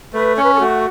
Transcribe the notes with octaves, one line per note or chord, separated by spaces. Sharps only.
A3 B4
C#4 C#5
B4
A4
A3 F#4